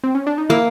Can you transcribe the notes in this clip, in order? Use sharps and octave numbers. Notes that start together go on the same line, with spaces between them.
C4
C#4
D4
D#4
A#3 E4